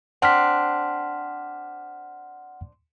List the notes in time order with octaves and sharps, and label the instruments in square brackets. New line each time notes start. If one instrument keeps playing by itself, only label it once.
[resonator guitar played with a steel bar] C4 D4 [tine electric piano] F#5 F6 B6